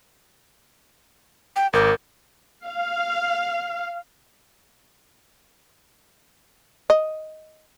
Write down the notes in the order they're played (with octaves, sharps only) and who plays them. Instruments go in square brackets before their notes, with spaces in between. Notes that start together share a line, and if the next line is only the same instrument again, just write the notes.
[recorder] G5
[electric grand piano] G#1 D6 G6 [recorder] A#4
[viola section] F5
[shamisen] D#5